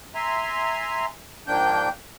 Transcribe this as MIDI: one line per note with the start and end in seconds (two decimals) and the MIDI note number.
0.15 1.06 76
0.15 1.06 80
0.15 1.06 82
0.15 1.06 84
1.47 1.89 44
1.47 1.89 53
1.47 1.89 58
1.47 1.89 62
1.47 1.89 79
1.47 1.89 91